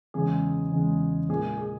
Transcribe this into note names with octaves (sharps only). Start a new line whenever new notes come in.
E2 C#3 G#3 G#4
E2 C#3 G#3
A#2 G#3 G#4
G#4